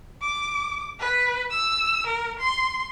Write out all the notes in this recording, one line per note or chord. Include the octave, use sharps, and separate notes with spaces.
D6
B4
E6
A#4
C6